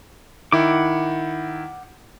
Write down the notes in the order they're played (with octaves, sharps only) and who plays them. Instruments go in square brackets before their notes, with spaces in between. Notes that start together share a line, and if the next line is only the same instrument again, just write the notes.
[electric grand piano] D#3 E4 [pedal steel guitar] F#5 D6